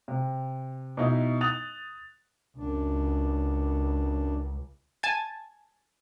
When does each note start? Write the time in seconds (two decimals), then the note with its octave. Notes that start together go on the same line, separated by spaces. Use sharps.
0.08 C3
0.97 B2 D#4 E4
1.41 D#6 F#6 A6 F7
2.57 C#2 F#2 D4
5.03 G#5 A5 G#6 A6